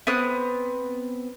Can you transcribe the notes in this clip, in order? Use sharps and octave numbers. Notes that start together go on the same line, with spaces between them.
B3 C4 D#6 F#6